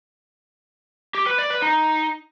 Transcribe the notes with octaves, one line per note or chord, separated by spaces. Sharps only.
G4
B4
D5
B4
D#4